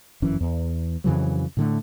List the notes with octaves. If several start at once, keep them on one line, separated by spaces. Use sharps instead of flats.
G1 F#2 E3 C#4
E2
F2 C#3 E3 F#3
A2 D3 A3